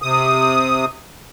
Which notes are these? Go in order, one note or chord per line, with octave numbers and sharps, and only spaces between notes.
C3 D#6